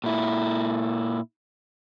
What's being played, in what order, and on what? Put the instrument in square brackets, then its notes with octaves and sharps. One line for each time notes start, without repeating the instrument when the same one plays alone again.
[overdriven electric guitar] A#2 E4